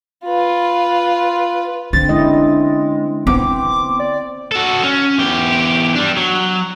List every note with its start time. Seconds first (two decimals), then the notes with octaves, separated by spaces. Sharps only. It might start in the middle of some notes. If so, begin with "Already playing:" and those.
0.25 F4 B4
1.93 D3 C4 D4 A6
2.09 G#3 C#4 E4 D#5
3.27 B3 C4 D6
3.99 D5
4.51 F#4 A4
4.83 C#4
5.18 E2 G4
5.95 G3 D4
6.17 F#3